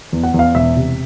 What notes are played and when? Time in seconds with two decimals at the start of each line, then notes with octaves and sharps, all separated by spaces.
0.13 E2
0.23 F#5
0.34 E2
0.39 F5
0.55 E1 E5
0.76 C3